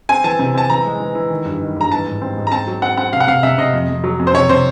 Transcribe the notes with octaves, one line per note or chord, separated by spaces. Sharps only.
C4 G#5
E3 A5
C3
C4 A5
E3 A#5
G#3
E3
E3
D#3
G2
D#3
G2 A#5
E3 A5
G#2
C4
G#2
A#5
C4 A5
F#3
C4 F#5
C4 F#5
C3 F5
F#5
C3 F5
C3 E5
C3 D#5
F2
F2
F#3
F2
C5
C3 C#5
C3 C5